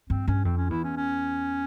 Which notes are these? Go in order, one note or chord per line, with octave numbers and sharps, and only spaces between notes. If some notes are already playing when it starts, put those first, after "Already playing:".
G2 C4
G2 C#4
F2 C4
C#4
E2 E4
C#4
C#4